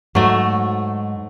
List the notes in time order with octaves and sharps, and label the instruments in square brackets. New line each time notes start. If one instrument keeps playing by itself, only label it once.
[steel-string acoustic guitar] G#2 [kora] F#3 A3